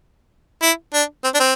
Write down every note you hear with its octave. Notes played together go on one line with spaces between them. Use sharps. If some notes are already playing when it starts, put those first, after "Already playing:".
E4
D4
C4
D4
C4